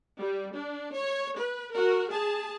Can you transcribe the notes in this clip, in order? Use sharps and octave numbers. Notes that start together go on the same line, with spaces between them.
G3
D4
C#5
B4
F#4 A#4
G#4 A5